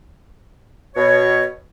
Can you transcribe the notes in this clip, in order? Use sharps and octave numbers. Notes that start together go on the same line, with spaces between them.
B2 C#5